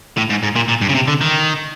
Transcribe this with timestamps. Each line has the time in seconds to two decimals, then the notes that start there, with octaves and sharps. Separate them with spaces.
0.17 A2
0.30 G#2
0.43 G#2
0.56 A#2
0.68 A#2
0.81 G2
0.89 C#3
0.95 C3
1.08 D3
1.21 D#3